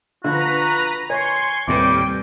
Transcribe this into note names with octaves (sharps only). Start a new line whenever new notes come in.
D3 F3 F#4 B4 A#5
C#5 G#5 C6 C#6
D#2 A2 C3 G3 B4 G5 D6